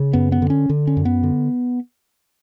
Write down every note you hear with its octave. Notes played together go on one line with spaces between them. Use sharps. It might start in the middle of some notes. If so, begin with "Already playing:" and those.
Already playing: C#3
F#2 B3
B3
D3
C#4
D3
C#4
F#2
B3
D3